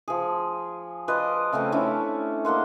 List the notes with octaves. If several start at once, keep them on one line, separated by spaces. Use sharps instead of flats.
F3 G#4
F4 B4 D5 D#5
C#3 A3 C4 C#4
A3 C#4 D4 E4
G#3 A#3 F#5 C6